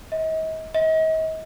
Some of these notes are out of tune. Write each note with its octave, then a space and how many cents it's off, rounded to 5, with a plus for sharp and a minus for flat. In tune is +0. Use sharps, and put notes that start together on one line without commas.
D#5 +40
D#5 +40